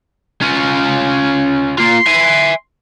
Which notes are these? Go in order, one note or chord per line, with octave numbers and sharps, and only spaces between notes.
C#4 F4
A#3 F4 C6
E5 G#5